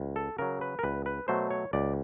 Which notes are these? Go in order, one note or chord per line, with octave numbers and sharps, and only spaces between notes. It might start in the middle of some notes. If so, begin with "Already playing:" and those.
Already playing: C#2
A4
C#3 F#3 A#4
B4
A#4
C#2 B4
B4
B2 F#3 A3 C5
C#5
C#2 D5